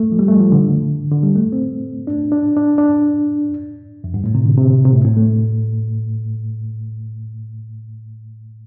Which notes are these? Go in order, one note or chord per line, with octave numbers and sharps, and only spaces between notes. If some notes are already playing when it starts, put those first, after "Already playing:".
Already playing: A3
F3
G3
A3
F3
D3
D3
G3
A3
C4
D4
D4
D4
D4
F2
G2
A2
C3
D3
C3
C3
A2
A2
A3